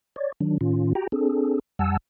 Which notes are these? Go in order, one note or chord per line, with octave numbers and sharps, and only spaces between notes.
C#5 D5
D#3 F#3 D4
A2 D#3 C#4 F4
F#4 G4 G5 A#5
C4 D4 G#4 A4
F2 G3 F#5 G#5 A5 E6